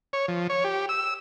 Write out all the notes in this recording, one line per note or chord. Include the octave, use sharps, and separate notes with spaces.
C#5
F3
C#5
G4
E6